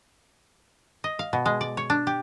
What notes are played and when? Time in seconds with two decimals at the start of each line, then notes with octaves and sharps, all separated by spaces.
1.04 D#5
1.19 F5
1.33 B2
1.46 G#3
1.61 D5
1.77 C#5
1.90 D4
2.07 G4